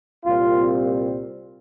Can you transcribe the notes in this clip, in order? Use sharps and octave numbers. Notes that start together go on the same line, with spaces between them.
C2 A#2 G3 C4 F4